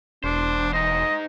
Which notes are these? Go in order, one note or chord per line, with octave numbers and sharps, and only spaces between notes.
E1 D4 C5
D#4 C5 D#5